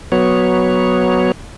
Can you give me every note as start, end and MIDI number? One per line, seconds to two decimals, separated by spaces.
0.12 1.32 54
0.12 1.32 59
0.12 1.32 73